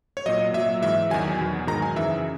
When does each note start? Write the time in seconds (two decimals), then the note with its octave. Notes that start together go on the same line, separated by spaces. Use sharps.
0.17 C#5
0.26 A#2 F#3 D#5
0.53 A#2 F#3 E5
0.82 G#2 E3 E5
1.10 E2 D#3 F#3 G#5
1.39 E2 B2 F#3
1.67 G#2 D#3 F#3 A#5
1.82 G#5
1.96 F#2 C#3 E3 E5